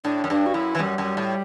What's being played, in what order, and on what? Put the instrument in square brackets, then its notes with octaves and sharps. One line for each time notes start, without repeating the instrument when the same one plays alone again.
[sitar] A2 [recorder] D4
[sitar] F#2
[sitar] G2 [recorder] D4
[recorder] F#4
[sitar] F#2 [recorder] E4
[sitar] E3
[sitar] F#2 [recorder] G3
[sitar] F#2
A2